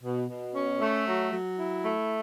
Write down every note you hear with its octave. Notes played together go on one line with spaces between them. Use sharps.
B2
B2
C#4
A3
F#3
F#3
E4
A3